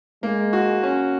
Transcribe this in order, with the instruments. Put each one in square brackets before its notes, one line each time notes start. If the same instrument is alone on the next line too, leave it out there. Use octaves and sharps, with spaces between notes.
[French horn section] G#3 [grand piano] A#3
[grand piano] F#4
C#4